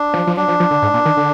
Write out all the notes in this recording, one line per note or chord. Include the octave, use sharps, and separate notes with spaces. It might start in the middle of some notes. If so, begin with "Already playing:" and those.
Already playing: D4
F3
F3
F#3 D4
F3
F3
D3
G#2
A#2
D#3
D3